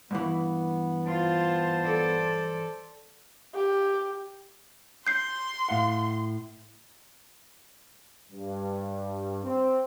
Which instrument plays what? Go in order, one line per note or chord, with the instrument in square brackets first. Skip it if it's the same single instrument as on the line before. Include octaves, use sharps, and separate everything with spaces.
[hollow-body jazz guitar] G2 E3 [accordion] B3
[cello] F4 [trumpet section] C5 A5
[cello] A4 D5
[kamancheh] G4
[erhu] C6 [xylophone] G6 C7
[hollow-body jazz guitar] A2 F5 F#5
[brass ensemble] G2
C4